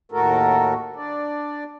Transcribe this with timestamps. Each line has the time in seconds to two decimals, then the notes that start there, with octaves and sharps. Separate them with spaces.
0.12 D#2 A2 A3 F#4 A4 A#4
0.96 D4 D5